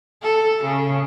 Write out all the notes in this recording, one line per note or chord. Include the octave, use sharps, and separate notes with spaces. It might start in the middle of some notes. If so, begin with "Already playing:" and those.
A4
C#3